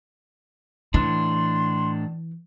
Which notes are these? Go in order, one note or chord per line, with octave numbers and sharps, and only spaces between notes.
A2 E3 D4 C6